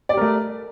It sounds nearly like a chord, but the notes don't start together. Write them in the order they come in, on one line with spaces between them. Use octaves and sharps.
D5 G4 A#4 A3